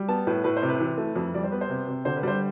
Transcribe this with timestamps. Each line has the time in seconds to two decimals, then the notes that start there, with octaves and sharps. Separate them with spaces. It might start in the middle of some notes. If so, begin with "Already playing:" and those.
Already playing: G3
0.08 B3 A5
0.27 A2 B4
0.44 A2 B4
0.57 C5
0.62 C3
0.68 B4
0.80 E3
0.98 A3
1.16 F2
1.34 G3 D5
1.44 C5
1.52 B3 B4
1.61 C5
1.69 C3
1.88 C3
2.05 D3 C5
2.17 B4
2.23 G3 C5